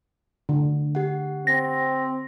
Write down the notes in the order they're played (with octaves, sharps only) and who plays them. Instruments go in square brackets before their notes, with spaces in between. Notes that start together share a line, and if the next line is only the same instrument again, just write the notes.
[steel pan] D3
[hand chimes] G4 F#5
[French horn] C4 [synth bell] A#6